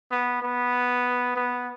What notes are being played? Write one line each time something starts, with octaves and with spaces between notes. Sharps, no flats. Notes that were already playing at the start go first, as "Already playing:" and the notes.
B3
B3
B3